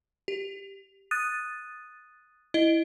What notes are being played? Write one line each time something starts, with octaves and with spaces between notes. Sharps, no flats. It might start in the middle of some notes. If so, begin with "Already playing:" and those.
G4
D#6 F#6 A6 D#7
E4 D#5 G7